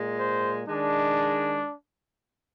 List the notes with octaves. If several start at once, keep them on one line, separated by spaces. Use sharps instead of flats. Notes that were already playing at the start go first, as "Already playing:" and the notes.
Already playing: A#2 G#3
C5
D#3 G#3 D4